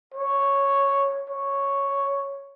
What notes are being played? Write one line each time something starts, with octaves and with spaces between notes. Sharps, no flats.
C#5
C#5